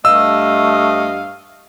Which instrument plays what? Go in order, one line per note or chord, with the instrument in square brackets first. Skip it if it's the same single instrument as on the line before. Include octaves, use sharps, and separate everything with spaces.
[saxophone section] G2 D#5 [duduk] A3 [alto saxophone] F5 [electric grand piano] E6